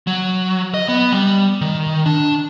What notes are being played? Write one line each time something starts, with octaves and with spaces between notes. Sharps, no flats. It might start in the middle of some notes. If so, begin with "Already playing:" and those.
F#3
D#5
B3
G3
D#3
D4